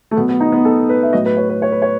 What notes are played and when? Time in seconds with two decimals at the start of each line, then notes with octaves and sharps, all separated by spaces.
0.11 A3
0.16 B2 F#3 B3
0.29 B3
0.40 D#4
0.52 B3
0.65 A4
0.89 B4
1.03 E5
1.13 A2 F#3 D#5
1.26 B4
1.37 C#5
1.49 B4
1.62 C#5
1.72 B4
1.82 C#5